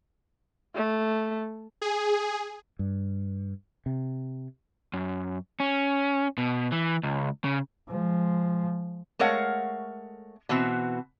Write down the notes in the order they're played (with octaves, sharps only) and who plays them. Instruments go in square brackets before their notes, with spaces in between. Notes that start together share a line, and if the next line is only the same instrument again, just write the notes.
[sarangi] A3
[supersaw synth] G#4
[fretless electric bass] G2
C3
[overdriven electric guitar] F#2
C#4
B2
E3
C#2
C#3
[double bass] F3 G#3
[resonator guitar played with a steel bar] G#3 A3 A#4 C#5 F5 F#5
B2 E3 C4 F#4